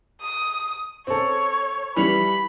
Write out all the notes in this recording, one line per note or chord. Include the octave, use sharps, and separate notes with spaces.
D#6
C4 A4 C#5
E3 G3 B5 F7